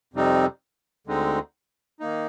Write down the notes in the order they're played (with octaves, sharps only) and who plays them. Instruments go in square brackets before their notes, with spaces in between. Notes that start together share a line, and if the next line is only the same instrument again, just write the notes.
[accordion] F2 C3 G3 C4 D#4
D2 D3 G#3 C4 D#4
D#3 A#3 D#4